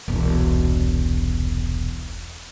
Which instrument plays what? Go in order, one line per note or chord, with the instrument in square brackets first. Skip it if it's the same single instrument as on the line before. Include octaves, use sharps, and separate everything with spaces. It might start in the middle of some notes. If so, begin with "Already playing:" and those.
[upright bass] E1 C2